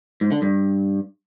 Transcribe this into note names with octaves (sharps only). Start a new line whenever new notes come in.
G#2
D3
G2